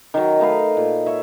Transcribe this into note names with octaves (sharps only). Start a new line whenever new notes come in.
D#3 F#3
A3 D#4 B4 F5
A#2
C#5 E5